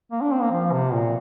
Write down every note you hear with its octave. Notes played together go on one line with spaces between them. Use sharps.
A#3
D4
C4
A#3
F3
C3
A#2